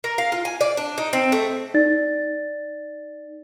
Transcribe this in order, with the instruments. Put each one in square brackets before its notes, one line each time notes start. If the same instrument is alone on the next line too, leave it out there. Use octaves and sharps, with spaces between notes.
[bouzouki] A#4
F5
F4
G#5
D5
D4
D#4
C4
A3
[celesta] D#4 D5 A6